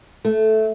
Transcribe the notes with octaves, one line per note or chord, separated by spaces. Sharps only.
A3